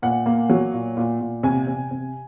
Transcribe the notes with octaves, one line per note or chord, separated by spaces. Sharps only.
A#2 F#5
A#3
F#3
A#2
A#2
A#2
C3 G#5
C3
C3